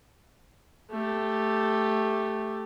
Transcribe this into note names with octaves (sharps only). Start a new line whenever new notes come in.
A3 G4